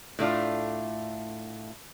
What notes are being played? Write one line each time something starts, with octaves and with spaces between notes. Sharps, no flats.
A2 A3 D4 F4